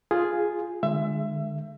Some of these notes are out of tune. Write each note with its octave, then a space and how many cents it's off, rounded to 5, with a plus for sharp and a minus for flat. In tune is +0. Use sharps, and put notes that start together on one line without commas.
F4 +0 G#4 +0
D3 +40 G#3 +0 E5 +25